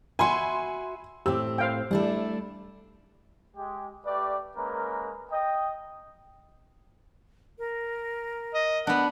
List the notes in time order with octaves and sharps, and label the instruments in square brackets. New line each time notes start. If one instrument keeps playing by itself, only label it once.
[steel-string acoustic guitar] F#4 E5 [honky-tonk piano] G#5 B5 C6
[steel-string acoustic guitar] A2 C4 [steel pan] G4 [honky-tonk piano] E6
[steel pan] C5 F5 G5
[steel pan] G3 [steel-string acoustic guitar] A3 D4 E4
[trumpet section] G#3 G4
A3 G4 B4 D5
G#3 A#3 C#4 A#4 B4
D#5 G5
[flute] A#4
[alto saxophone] D#5
[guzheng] B3 D4 [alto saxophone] F#5